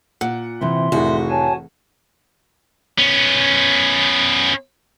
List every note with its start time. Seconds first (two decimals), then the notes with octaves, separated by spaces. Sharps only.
0.21 A#2 F#5
0.61 C3 E3 C4 E5 C6
0.92 F1 A2 F#4 G#4
1.30 C#5 G#5 A5
2.98 B3 C#4